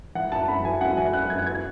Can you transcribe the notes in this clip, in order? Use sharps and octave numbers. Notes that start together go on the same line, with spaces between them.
E3 F#5
F#2 A5
F#2 B5
E3 G#5
F#2 F#5
E3 G#5
F#2 F#6
F#2 G#6
G#6